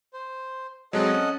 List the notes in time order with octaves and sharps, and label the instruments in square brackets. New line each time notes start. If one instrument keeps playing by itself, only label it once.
[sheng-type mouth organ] C5
[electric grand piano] F#3 G#3 C4 [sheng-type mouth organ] A4 D#5 F#5
[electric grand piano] C#4